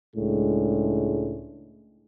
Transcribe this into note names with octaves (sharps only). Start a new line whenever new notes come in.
C#2 A2 G#3 D4